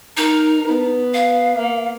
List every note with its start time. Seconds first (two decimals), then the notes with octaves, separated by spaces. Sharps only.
0.17 D#4 A#4
0.67 B3
1.14 F5
1.57 A#3